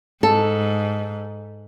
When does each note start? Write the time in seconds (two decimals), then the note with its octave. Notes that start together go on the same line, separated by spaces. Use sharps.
0.23 G#2 A4